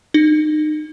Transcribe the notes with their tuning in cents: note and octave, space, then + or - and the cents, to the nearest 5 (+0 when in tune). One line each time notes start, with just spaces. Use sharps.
D#4 -30